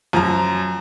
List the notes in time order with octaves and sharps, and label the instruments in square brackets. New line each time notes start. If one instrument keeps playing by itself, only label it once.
[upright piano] F#2 A#5 [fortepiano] F3